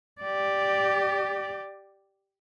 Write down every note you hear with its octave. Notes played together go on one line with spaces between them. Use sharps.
G4 D5